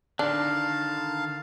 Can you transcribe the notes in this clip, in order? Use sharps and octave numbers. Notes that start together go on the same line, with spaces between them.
D3 D#3 D4 F5 A5